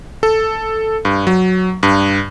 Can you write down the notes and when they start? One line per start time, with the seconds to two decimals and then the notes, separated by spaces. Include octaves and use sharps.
0.23 A4
1.05 G2
1.27 F#3
1.83 G2